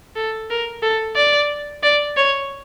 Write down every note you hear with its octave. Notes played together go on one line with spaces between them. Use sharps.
A4
A#4
A4
D5
D5
C#5